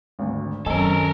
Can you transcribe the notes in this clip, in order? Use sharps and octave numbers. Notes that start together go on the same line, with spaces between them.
G#1 D2
F#2 D#3 C4 C#4 A4 A#4 D#5 G#5